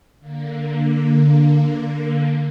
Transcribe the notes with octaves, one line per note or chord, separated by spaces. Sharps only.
D3 A#3